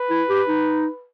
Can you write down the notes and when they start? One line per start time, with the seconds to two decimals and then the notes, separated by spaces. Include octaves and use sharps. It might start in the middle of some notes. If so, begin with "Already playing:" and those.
Already playing: B4
0.10 E4
0.28 G4
0.47 D#4